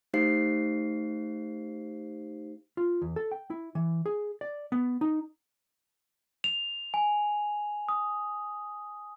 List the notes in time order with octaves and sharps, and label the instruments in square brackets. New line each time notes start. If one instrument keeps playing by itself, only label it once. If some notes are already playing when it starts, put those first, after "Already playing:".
[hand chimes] A3 D#4 G4 C5 F5 C7
[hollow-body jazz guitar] F4
E2
A4
G5
E4
E3
G#4
D5
B3
D#4
[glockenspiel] F7
G#5
D#6